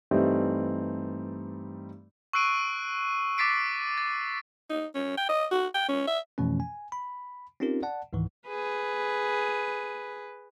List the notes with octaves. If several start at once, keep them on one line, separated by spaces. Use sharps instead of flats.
G2 E3 G3 A3 C4 D#4
C#6 E6 F#6 C7 D7 D#7
C#6 D6 A6 B6 C7 D7
A6
D#4
C#4
G5
D#5
F#4
G5
C#4
E5
F2 B2 E3 F3 A3 C#4
G#5
B5
C4 C#4 D#4 F4 G4 A#4
D5 F#5 A5
C#2 G#2 D#3 E3
G#4 B4